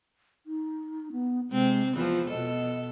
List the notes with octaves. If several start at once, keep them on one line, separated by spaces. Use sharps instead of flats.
D#4
B3
C3 G#3 C4
E2 E3 F3 F4
B2 A4 D#5